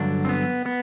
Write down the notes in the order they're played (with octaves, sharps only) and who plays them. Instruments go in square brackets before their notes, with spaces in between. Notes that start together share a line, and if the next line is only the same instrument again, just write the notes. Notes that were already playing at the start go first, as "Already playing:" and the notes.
Already playing: [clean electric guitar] G2 D3 F#3 D4
C4
B3
B3